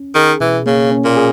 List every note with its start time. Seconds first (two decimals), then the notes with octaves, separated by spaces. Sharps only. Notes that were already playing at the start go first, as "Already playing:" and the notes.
Already playing: C#4
0.15 D#3 G#4
0.40 B2 E3
0.66 C#3 A#3
0.91 C#4
1.05 A#2
1.17 G#4